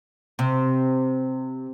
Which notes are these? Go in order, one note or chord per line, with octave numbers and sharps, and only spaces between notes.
C3